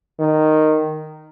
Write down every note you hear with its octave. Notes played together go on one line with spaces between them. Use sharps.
D#3